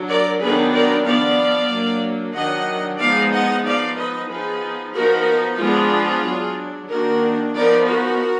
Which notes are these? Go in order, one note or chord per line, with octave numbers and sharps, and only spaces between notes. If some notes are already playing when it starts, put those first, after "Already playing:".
Already playing: F#3 D4
A#4 D5
D#3 F#3 B3 D4 G#4 B4
A#4 D5
F3 B3 D4 D5 F5
F#3 A#3 D4
D#3 F#3 D4 D#5 F#5
F3 G#3 B3 D#4 D5 F5
D#5 F#5
F3 B3 D#4 D5 F5
B4 D#5
F3 B3 D#4 G#4 B4
F3 B3 D#4 F#4 A#4
F3 G#3 B3 D4 F4 G#4
F#3 D4
D#3 A#3 D4 F#4 A#4
F3 B3 D#4 A#4 D5
F#4 A#4